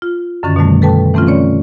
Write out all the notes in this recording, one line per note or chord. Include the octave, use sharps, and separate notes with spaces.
F4
F#2 D3 D#3 C#4 A6
B2 D#3 G3 A3
A4 B4 G5 A5
E3 A3 C4 C#4 F4
C4 C#4 C#5 D5